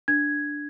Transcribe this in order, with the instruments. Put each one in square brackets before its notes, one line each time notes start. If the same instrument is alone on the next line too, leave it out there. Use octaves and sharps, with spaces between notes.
[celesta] D4 G#6